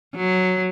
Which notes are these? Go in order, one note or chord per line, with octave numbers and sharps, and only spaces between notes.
F#3